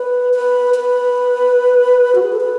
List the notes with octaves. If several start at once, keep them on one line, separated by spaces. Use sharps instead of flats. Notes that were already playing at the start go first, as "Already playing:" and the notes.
Already playing: B4
B4
B4
F#4
G#4
A4
B4